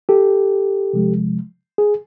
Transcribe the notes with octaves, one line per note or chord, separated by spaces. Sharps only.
G4 A4
C3 F3 G#3
G#4